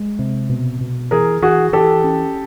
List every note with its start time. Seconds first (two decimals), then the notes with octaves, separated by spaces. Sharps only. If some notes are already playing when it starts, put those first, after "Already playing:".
Already playing: G#3
0.19 C3
0.49 B2
0.81 B2
1.11 E3 G#4 A#4
1.42 E3 F#4 G#4
1.72 E3 G4 A4
2.04 C#4